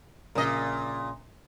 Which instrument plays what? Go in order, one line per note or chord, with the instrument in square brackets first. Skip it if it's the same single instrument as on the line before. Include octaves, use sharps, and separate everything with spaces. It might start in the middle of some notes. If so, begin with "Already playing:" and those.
[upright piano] A#1 C#3 A#4 [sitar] A#2 D#5